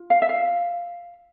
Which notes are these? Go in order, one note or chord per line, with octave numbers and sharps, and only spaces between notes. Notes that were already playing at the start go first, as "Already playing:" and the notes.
Already playing: F4
F5
E5
F5